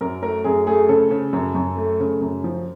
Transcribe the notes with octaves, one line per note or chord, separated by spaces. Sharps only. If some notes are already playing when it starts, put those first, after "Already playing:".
F#2 A#4
A3 A#4
F#2 G#4
A3 G#4
C#3 A4
C#3
F#2
F#2
A3
C#3
F#2
F3